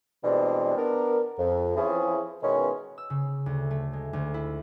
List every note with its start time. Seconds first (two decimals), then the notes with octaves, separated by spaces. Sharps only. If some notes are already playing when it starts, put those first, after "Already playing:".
0.24 B2 E3 G3 G#3 C4 D4
0.76 B3 D4 A#4
1.38 F2
1.76 E3 F3 C4 C#4 E4 G#4
2.43 B2 D#3 E3 G#3 B3 C#4
2.98 E6
3.10 C#3
3.46 D2
3.71 A3
3.93 G#3
4.13 D2
4.34 E4